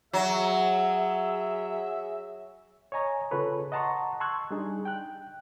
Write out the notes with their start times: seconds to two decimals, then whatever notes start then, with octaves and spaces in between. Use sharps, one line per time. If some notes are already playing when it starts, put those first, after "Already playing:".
0.13 F#3 G#4 E5
2.92 C#5 D#5 G#5 A#5
3.31 C#3 F4 G#4 A4 B4 C#5
3.72 D#5 F#5 A5 A#5 C6 C#6
4.20 A5 C6 C#6 E6 F#6 G#6
4.51 G3 D4 D#4 G#4
4.85 G5 F#6